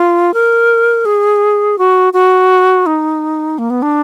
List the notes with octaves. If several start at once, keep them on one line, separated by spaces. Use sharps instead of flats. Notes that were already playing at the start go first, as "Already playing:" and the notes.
Already playing: F4
A#4
G#4
F#4
F#4
D#4
A#3
B3
D4